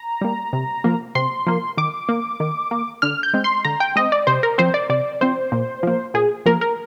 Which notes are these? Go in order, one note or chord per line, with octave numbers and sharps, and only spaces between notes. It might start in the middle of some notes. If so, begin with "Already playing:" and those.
Already playing: A#5
G3 A#3
C3
F3 A#3
C3 C6
F3 A#3
D#3 D6
A#3
D#3
A#3
D3 F6
G6
G#3 C4
C6
D3 A#5
G5
G#3 C4 D#5
D5
C3 C5
A#4
F3 C4 C5
D5
C3 D5
F3 C4 C5
A#2
F3 A#3
A#2 G#4
F3 A#3 A#4
A#4